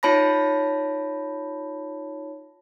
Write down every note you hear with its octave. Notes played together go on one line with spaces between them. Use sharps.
D#4 F4 C#5 A5 B5 A#6